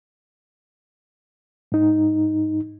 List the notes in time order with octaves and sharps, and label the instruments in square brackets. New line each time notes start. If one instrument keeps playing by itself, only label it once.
[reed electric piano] G#2 D#4